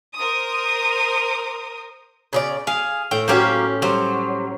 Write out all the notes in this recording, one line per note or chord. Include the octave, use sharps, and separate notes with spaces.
A#4 C5 D#6
C#3 G#4 D5
G#4 F5
A2 G5
F#3 G3 A#3 C#4 G4 C5
F#3 G3 C5